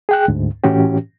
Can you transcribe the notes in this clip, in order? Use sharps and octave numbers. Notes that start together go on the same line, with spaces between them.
G#4 G5 F#6
D2 G#2
A2 E3 C#4 F#4 G4